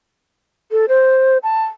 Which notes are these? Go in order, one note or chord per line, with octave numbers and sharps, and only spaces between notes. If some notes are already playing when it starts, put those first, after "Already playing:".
A4
C5
A5